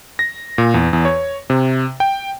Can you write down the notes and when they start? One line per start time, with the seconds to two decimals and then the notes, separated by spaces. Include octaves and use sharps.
0.19 A#6
0.58 A#2
0.74 E2
0.93 E2
1.05 C#5
1.50 C3
2.00 G5